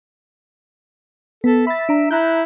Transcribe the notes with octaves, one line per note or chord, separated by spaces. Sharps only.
B3 A4
E5 B5 A6
D4 A#5
E4 A#5 F#6 G6